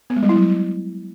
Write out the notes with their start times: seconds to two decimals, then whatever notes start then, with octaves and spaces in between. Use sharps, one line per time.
0.10 B3
0.16 G#3
0.23 G3
0.29 E4
0.36 F#3